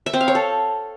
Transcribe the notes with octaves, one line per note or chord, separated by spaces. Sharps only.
E5
C4
F5
C#5
A4